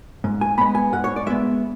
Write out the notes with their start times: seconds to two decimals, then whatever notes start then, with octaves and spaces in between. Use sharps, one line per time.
0.24 G#2
0.41 G#5
0.58 G#3 B3 B5
0.75 G#5
0.93 G#2 F#5
1.04 C#5
1.16 D5
1.26 G#3 B3 E5